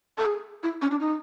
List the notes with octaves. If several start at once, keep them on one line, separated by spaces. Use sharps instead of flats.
A4
G#4
E4
C#4
D4
D#4